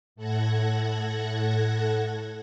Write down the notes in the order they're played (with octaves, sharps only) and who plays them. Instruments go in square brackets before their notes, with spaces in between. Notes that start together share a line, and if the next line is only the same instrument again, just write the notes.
[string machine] A2 A4 F#5 F#6 G#6 A#6